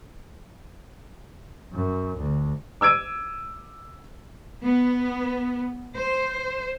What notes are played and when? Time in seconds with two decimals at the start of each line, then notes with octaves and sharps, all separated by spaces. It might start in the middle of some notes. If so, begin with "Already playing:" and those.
1.73 F#2
2.18 D2
2.81 D6 E6 G#6 D7 D#7
4.65 B3
5.94 C5